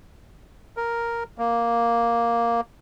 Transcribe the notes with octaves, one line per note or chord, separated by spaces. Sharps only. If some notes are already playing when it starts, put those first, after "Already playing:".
A#4
A#3